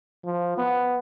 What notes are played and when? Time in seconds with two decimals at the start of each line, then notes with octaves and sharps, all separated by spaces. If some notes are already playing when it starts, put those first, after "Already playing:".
0.25 F3
0.58 B3